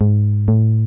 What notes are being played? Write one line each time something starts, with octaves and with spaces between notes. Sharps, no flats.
G#2
A2